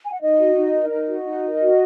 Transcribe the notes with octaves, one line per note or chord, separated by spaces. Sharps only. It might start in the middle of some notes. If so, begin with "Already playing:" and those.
G#5
F#5
D#4 D#5
F#4
D#4
A#4
D#4 D#5
F#4
D#4
A#4
F#4